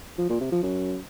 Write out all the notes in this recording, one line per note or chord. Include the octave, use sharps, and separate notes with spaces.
F3
A#2
C3
F3
F#2